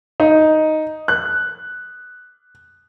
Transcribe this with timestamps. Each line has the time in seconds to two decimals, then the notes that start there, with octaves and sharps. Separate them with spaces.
0.20 D#4
1.08 F#6